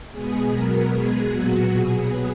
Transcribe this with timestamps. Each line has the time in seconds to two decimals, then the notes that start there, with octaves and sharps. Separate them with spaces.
0.12 B2 G#3 B3 G#4
0.52 B2 F#3 B3 A#4
0.92 B2 G#3 B3 G#4
1.31 A#2 F#3 B3 F#4
1.71 B2 F#3 B3 G#4